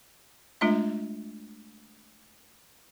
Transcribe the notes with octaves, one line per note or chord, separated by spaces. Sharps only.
G#3 A3 D4 F4 E5